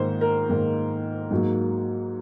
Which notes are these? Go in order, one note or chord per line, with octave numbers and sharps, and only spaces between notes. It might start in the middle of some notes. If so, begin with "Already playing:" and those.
Already playing: G#2 D#3 A#3 C5
A#4
G#2 D#3 A#3
G#2 F#3 A#3